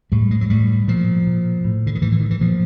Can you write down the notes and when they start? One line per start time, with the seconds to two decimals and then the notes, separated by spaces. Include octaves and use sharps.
0.12 A2 G3
0.31 G#3
0.41 F#3
0.50 A2 G3
0.88 A#2 F3
1.27 A#2
1.64 A2
1.87 D3
1.95 D#3
2.02 A2 E3
2.12 E3
2.21 D#3
2.31 E3
2.41 A#2 F3